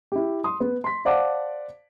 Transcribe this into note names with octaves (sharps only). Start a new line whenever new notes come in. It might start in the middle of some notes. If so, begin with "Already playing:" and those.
E4 G4
C6 D#6
B3
C6 B6
C5 D5 F5 F#5 A5 D6